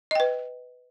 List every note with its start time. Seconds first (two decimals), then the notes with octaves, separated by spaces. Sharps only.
0.11 D#5
0.15 G5
0.20 B4